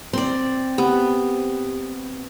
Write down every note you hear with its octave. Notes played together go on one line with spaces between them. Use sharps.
C4 D5 C6
B3 G4